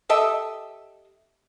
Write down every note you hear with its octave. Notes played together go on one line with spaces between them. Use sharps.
G4 A4 D#5 E5